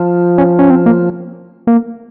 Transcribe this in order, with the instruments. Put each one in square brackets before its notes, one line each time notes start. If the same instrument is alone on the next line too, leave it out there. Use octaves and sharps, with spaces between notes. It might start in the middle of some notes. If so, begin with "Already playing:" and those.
Already playing: [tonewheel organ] F3
[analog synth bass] C#4
C#4
C4
A#3
A#3